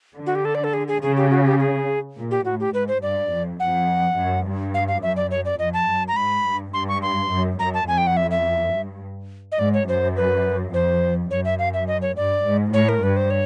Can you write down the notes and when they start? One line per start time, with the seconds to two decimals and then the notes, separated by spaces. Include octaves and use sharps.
0.16 D3
0.26 F#4
0.35 G4
0.45 A4
0.55 D5
0.64 A4
0.73 G#4
0.88 G#4
1.02 C#3 G#4
1.17 G4
1.31 F#4
1.45 G4
1.59 G#4
2.17 A#2
2.31 G4
2.45 A2 F#4
2.60 G4
2.74 G#2 B4
2.88 C5
3.02 G2 D5
3.31 F2
3.60 F2 F#5
4.16 F#2
4.46 G2
4.74 F5
4.88 F5
5.02 F#2 E5
5.17 D5
5.31 C#5
5.45 D5
5.59 F2 D#5
5.73 A5
5.87 F#2
6.08 A#5
6.16 G#2 B5
6.44 G2
6.74 G2 C6
6.88 C#6
7.02 C6
7.31 F#2
7.59 F#2 A#5
7.74 A5
7.87 F2 G#5
7.98 G5
8.07 F#5
8.17 E5
8.31 E5
8.73 G2
9.52 D#5
9.59 G#2 D5
9.74 C#5
9.88 F#2 C5
10.17 B4
10.73 F2 C5
11.30 F#2 C#5
11.45 E5
11.59 F5
11.74 E5
11.88 D#5
12.02 C#5
12.16 G2 D5
12.45 G#2
12.73 A2 C#5
12.89 A#4
13.02 G2 B4
13.17 C5
13.30 C#5